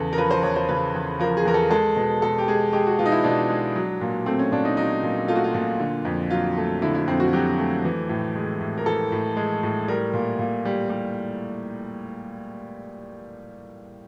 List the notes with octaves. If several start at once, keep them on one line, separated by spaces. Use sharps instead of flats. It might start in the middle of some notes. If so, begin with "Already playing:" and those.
Already playing: E2 C#3 A4
A#4
F3 B4
C5
E2 C#5
C5
C#3 B4
E2
F3 A#4
G#4
E2 A#4
A4
G#3 A4
B2
B2 A4
G4
G#3 G#4
G#3 G4
F#4
B2 F4
D#4
E4
B2 D4
G#3
F#3
A#2
A3 C4
C#4
A#2 D4
D#4
F#3 D#4
A#2
A3 F4
F#4
F4
A#2 F4
D3
F2
F#3 F4
A3
D3 E4
E4
F2 C4
F#4
F#3 G4
A3
E3
A2
G#3
A2
A#4
E3 A4
A2
G#3
A2
G3 A#4
A#2
A#2
G3
G3